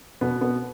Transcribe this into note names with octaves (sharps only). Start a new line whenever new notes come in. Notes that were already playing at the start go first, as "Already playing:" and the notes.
B2 B3
B3